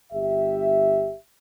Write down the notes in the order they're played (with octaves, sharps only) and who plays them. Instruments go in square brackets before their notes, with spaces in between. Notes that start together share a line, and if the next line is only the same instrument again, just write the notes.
[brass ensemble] G1 G4 E5